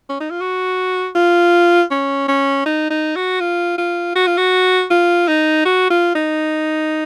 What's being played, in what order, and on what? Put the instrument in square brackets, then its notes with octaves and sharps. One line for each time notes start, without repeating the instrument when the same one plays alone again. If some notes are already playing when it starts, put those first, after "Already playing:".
[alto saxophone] C#4
D#4
F4
F#4
F4
C#4
C#4
D#4
D#4
F#4
F4
F4
F#4
F4
F#4
F4
D#4
F#4
F4
D#4